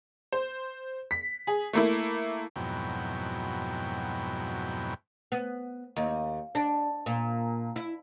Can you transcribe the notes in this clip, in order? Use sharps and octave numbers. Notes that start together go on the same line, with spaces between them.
C5
B6
G#4
A3 A#3 E4
F2 G#2 B2 F#3 E4 G5
B3
D#2
D4
A#2
E4